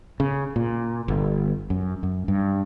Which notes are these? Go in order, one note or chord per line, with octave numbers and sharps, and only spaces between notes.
C#3
A#2
G1
F#2
F#2
G2